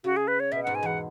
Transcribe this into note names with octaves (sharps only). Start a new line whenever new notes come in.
C#3 F#4
G#4
B4
C#5
B2 E5
G#2 F#5
G#5
E2 F#5